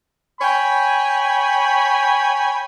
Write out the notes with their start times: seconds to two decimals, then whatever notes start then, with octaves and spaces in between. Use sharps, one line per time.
0.41 C#5 G5 G#5 B5